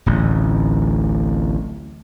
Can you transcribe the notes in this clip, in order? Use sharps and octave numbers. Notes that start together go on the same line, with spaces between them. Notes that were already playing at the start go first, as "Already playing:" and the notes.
D1 A1